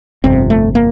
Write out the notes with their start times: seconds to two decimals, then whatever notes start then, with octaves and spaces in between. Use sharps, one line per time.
0.24 G1 F2 C3 C4
0.50 A3
0.75 A#3